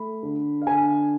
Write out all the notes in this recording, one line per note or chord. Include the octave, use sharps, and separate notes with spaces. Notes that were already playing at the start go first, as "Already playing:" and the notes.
Already playing: A3 B5
D3
F5
D3 G#5